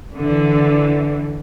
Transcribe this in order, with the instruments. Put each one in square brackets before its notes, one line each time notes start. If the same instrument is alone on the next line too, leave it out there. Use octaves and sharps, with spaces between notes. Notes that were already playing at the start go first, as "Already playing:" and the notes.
[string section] D3 E3